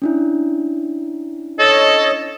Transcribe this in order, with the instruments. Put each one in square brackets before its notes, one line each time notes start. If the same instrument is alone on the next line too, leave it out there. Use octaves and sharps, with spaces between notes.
[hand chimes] C#4 D4 E4
[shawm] A4 [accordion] C#5 D#5